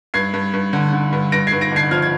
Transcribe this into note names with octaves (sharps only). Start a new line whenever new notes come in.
G2 G#6 C7
G2
G2
D3
D3
G2
G2 A#6 D7
G#6 C7
G2
A#6 D7
G1 G#6 C7
F3 F6 G#6
G#6